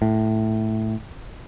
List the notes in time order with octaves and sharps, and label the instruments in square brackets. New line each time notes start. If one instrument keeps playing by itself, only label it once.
[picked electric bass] A2